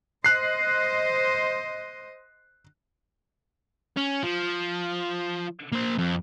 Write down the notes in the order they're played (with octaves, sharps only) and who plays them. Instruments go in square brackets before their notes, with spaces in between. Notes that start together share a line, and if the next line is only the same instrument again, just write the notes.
[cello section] C5 D#5 [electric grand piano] F#6 C7
[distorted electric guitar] C#4
F3
A#3 C5
F2